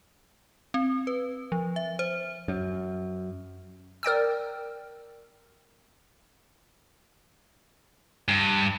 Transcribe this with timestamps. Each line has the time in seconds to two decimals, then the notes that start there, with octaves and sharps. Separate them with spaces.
0.74 C4
1.07 B4
1.52 F3
1.76 E5
1.99 C5
2.48 F#2
4.03 A#4 D5 G5 E6
8.28 G2